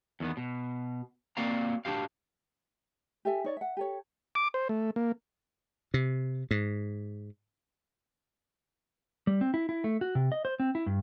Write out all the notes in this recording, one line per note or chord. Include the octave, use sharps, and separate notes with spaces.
E2 D#3 B3
B2
A#3 C4 F#4 D5 F5 A#5
D4 D#4 F#4 G4 F5
G4 A4 E5 G#5
D#4 C#5 D5
E5 F#5
G4 A4 C#5
D6
C5
A3
A#3
C3
G#2
G3
C4
E4
E4
A3
F#4
C3
D#5
C5
C4
E4
G2